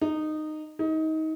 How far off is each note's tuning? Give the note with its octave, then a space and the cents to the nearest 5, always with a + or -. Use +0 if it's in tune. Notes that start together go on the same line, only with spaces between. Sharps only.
D#4 -15
D#4 +25